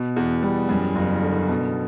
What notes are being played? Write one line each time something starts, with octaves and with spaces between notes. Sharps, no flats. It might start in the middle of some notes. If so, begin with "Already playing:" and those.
Already playing: B2
E2
G3
F#2
F#1
D3
B2